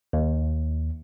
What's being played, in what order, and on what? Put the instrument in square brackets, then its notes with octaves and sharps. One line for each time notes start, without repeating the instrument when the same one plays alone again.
[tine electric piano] D#2